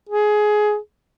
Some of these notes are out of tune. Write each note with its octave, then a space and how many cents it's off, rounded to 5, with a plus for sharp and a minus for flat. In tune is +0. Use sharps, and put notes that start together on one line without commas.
G#4 +20